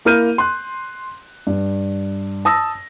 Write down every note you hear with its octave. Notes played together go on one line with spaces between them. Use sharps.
A#3 E4 A#4 F6 G6 D#7
C6 F#6
G2
A5 D#6 E6 A#6